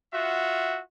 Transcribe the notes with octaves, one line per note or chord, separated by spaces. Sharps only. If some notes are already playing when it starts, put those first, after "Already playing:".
F4 F#4 E5 F#5